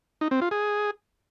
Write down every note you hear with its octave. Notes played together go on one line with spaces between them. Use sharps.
D#4
C4
F4
G#4